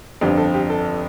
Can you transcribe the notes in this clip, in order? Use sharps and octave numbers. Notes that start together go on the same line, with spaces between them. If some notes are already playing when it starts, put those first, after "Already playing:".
G1 F2 D3 F3 G4
A4
G4
A4